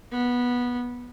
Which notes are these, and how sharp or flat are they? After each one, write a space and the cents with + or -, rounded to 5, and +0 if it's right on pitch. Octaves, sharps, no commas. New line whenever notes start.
B3 -15